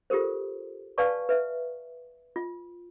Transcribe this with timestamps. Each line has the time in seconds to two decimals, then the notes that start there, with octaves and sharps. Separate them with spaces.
0.10 F4 G4 A4 A#4 C5
0.98 B4 D5 F5 G#5 A5 C#6
1.29 B4 E5
2.36 F4